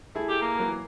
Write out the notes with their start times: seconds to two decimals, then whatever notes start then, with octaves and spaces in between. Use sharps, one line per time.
0.15 A3 E4 G#4
0.29 G4
0.41 A#3
0.58 E3 F#3 A#4